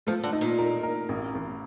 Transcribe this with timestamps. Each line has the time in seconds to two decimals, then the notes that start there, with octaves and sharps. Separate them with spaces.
0.07 F3 A3
0.24 D3
0.33 D#4
0.41 A#2
0.59 A#4
0.83 A#4
1.09 A1
1.35 A1